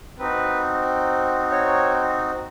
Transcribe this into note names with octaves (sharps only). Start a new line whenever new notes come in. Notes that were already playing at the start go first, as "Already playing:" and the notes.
C4 D#4 F#4 B4
C#5